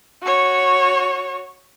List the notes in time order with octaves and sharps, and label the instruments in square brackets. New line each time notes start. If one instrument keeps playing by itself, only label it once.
[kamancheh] F#4 C#5